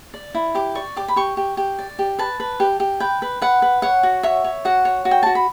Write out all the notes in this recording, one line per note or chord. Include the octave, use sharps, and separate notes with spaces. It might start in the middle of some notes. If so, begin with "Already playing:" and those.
D5
E4
G4 D6
D5 C#6
G4 D6
B5
G4 C#6
G4
G4
D5
G4
B4 A5
B4
G4
G4
B4 G5
B4
B4 F#5
B4
C#5 F#5
F#4
C#5 E5
C#5
F#4 F#5
C#5
F#4
G5
F#4 A5
B5